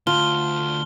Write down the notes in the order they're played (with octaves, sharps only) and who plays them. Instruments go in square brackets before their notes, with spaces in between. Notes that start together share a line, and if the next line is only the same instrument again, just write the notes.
[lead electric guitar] D2 [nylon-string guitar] F4 [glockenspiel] A5 C6 F6 [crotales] G7